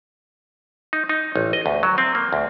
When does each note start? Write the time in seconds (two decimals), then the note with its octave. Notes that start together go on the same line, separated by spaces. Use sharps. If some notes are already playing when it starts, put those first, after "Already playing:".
0.93 D#4
1.09 D#4
1.36 A1
1.53 D#5
1.66 D2
1.83 F#3
1.98 C4
2.15 A#3
2.33 D2